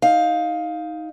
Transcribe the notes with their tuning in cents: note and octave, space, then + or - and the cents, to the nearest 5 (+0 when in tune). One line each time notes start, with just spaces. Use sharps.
D#4 +15 F5 +10